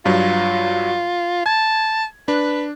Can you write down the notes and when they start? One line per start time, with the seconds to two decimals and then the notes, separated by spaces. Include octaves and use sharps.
0.06 G2 F#3 F4
1.46 A5 G#6
2.28 D4 B4